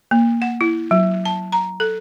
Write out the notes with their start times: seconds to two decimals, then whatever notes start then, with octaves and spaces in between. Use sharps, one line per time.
0.11 A#3
0.42 F#5
0.61 E4
0.91 F#3
1.26 A5
1.52 A#5
1.80 A4